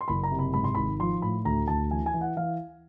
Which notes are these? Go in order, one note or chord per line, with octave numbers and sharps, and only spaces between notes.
C6
F#1 B5
A#5
C3
B5
G#2 B5
C6
G#1 B5
F3 C6
A2 B5
D2 A#5
D2 A5
E3 G#5
G#5
E3
F#5
E3 F5